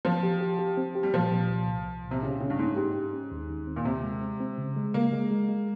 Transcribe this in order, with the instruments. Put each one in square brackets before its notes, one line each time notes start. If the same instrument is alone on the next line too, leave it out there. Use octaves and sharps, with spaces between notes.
[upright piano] F3 [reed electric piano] C4
[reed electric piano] G4
G4
G4
C4
G4
[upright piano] G3
[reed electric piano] A#2 [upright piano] F3
[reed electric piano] A#2
C2
C2
C2
A#2
[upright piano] C3
[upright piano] C#3 [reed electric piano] G4
[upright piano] C#3 [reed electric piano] C#4
[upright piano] G2
[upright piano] G#2 [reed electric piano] C#4
[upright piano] G#2 [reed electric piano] G4
[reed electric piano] G4
C#4
D#2
D#3
C4
[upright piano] A#2
[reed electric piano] D#2 [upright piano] C3
[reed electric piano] G#3
C4
C4
C#3
G#3
[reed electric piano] C#3 [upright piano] A#3
[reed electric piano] G#3
G#3
G#3